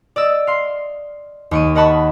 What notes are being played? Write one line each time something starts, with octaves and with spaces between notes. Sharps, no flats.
D5 D#5 E6
F5 C6
D#2 C#6 D#7
A#4 D#5 F#5 A5 B5 C#6